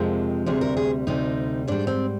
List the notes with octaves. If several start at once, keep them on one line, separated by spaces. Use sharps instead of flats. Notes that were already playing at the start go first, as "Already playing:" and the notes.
Already playing: F2 C3 F3 G#3 A#4
D2 C3 G3 G#4
A#4
G#4
D2 C3 G3 D#4
G#2 G3 D4
C4